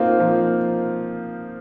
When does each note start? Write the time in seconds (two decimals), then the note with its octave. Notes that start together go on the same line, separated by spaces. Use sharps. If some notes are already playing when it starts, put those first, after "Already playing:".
Already playing: A#3 C4 D#4 F4
0.19 F3 A#3